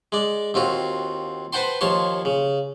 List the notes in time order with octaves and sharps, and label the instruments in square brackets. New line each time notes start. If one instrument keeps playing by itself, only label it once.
[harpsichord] G#3 D5
D#2 C4 F4 F#4
B4 C5 F#5 G5 A5 C6
D#2 F3 C#5 A5 C6
C#3